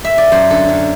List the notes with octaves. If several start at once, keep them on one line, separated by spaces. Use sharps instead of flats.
E5
D5
F#2 C5
D3 A4
F#2